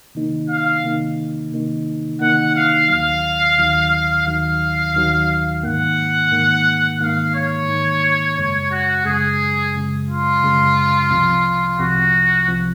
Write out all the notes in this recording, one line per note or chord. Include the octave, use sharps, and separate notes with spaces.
C3 D#3 A#3 D#4
F5
C3 D#3 A#3 D#4
C3 D#3 A#3 D#4
C3 D#3 A#3 D#4 F#5
F5
D#2 D#3 F#3 F5
D#2 D#3 F#3
D#2 D#3 F#3 F5
D#2 D#3 F#3
G#2 D#3 A#3 F#5
G#2 D#3 A#3
G#2 D#3 A#3 F5
C#5
G#2 D#3 A#3
F#2 C#3 G#3 C#5
F#4
F#2 C#3 G#3 G#4
F#2 C#3 G#3
F4
F#2 C#3 G#3
C2 C3 F3
C2 C3 F3 F#4
C2 C3 F3